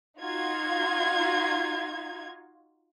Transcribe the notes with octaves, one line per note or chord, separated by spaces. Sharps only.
D#4 F4 F#4 G#6